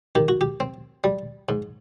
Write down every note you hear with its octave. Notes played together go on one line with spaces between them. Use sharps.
D#3 G4
F#4
G4
C4
G3
G#2